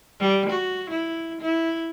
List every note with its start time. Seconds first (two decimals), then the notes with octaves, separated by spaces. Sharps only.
0.20 G3
0.49 F#4
0.90 E4
1.41 E4